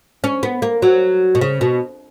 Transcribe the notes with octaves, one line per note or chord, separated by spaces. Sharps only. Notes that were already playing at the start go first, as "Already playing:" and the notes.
C#4
B3
A#3
F#3
B2
C#3
B2